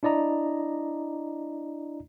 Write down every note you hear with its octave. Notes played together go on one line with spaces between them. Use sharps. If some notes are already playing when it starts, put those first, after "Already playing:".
D4 E4 D5 D#5 A#5